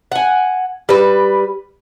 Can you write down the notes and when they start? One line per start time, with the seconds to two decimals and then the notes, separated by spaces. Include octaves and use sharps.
0.12 F#5 G#5
0.89 G3 B4